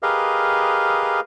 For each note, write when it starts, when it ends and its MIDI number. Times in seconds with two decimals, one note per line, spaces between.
0.03 1.20 67
0.03 1.20 68
0.03 1.20 70
0.03 1.20 71
0.03 1.20 75
0.03 1.20 77